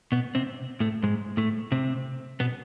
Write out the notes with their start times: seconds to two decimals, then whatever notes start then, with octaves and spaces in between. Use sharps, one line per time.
0.12 B2 B3
0.35 C3 C4
0.80 A2 A3
1.03 G#2 G#3
1.37 A2 A3
1.72 C3 C4
2.40 B2 B3